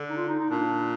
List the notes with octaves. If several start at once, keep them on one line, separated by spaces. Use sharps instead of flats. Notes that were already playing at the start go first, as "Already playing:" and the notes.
Already playing: D3
D#4
F4
D#4
D#4
A#2 D4